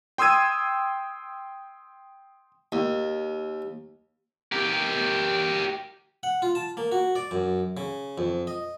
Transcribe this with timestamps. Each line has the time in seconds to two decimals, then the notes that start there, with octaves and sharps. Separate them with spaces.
0.18 G5 C6 D#6 E6 G#6 D#7
2.72 D#2
4.52 G4 A#4
6.23 F#5
6.42 F4
6.55 A5
6.77 A#3
6.92 F#4
7.16 D5
7.31 F#2
7.77 C#3
8.18 F2
8.47 D#5